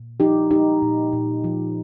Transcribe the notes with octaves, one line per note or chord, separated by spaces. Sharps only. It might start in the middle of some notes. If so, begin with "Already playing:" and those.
Already playing: A#2
F3 D#4 G4
G#3 D#4 G4
A#2
A#2
F3